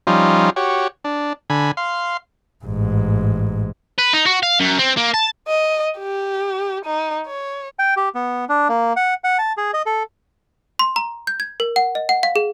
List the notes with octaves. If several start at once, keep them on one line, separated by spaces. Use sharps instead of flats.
F3 G3 C#4 D#4 F4
F#4 G4 C#5
D4
D3 G#5 B5
F5 C6
A1 G#2
B4
D#4
F#4
F5
F#2
C4
A#3
A5
D#5
G4
D#4
C#5
G5
G4
B3
D4
A#3
F#5
F#5
A5
G#4
D#5
A4
C6
A#5
G6
G#6
A#4
F#5
D#5
F#5
F5
G#4